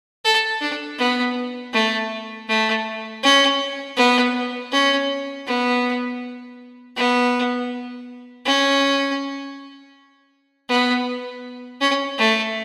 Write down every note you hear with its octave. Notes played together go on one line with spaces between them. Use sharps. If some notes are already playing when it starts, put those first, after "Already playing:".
A4
D4
B3
A3
A3
C#4
B3
C#4
B3
B3
C#4
B3
C#4
A3